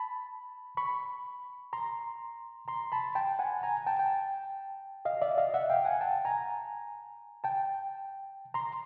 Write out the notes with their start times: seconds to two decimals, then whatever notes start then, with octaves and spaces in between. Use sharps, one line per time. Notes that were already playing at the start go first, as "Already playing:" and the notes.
Already playing: A5 B5
0.77 B5 C#6
1.73 A#5 C6
2.68 A#5 C6
2.92 A5 B5
3.15 G5 A5
3.39 F#5 G#5
3.63 G#5 A#5
3.87 G5 A5
3.99 G5 A5
5.05 D#5 F5
5.22 D5 E5
5.38 D#5 F5
5.54 E5 F#5
5.70 F5 G5
5.85 F#5 G#5
6.01 G5 A5
6.25 G#5 A#5
7.44 G5 A5
8.54 A#5 C6